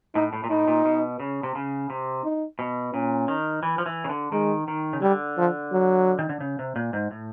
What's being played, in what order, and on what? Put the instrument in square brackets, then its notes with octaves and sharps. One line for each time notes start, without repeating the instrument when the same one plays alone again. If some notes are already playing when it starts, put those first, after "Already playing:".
[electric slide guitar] A2 [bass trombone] D#4
[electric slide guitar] A2
A#2
[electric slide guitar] A2 [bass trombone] D#4
[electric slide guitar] A#2
B2
C#3
C3
C#3
C3
[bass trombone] D#4
[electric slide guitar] B2
[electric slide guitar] A#2 [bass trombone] C#4
[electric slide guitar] D#3
E3
F3
E3
C#3
D3
[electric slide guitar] D#3 [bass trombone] G#3
[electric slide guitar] D#3
C#3
[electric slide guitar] D3 [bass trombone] G3
[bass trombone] F3
F#3
[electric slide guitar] D#3
D3
C#3
C3
A#2
G#2
A2